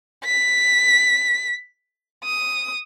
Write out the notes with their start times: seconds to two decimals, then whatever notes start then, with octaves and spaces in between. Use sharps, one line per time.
0.25 B6
2.24 D#6